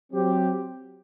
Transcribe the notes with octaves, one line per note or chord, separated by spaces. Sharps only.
F#3 C4 G4 C5